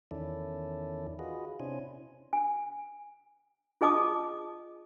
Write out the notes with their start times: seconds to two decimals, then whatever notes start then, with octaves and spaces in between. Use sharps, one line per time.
0.11 E2 D#3 C#4 E4 A4 D5
1.19 F4 F#4 G#4 B4 D#5
1.60 C3 C#4 D4 E4 C5 G#5
2.33 G#5
3.81 F4 G#4 D#5 A5 D6 D#6